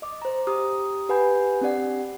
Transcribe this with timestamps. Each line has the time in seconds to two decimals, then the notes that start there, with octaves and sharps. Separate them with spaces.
0.02 D#5 D6
0.22 C5 A#5
0.47 G4 A#5 D#6 F6
1.09 G4 B4 F#5 G#5 B5 G6
1.61 C4 D4 G4 D5 F#5